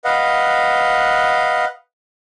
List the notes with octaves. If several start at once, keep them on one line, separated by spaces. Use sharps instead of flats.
B4 D#5 F5 F#5